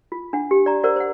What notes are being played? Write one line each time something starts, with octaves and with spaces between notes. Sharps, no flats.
F4
D4 F#5
G4
D5 A#5
A#4 C5 D5 F#5
C5 F#5